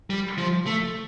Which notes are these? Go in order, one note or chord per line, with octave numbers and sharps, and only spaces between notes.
G3
F3
A3